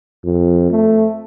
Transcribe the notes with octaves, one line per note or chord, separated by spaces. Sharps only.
F2
A3